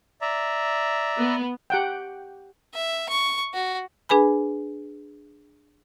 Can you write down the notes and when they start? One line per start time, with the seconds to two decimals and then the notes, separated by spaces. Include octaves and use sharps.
0.21 D5 E5 A#5
1.17 B3
1.70 G4 F#5 G5
2.73 E5
3.09 C#6
3.54 F#4
4.09 D4 G#4 B4 G#5 B5